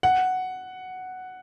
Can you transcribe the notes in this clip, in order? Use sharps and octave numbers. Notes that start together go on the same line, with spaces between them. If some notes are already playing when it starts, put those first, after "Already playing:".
F#5